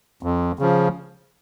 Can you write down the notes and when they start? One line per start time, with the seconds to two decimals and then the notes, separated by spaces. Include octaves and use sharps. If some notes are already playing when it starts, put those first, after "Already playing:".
0.23 F2
0.59 C#3 F3